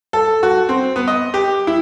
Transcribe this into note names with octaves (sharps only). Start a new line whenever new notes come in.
A4
F#4
C4
B3
D#5
G4
E4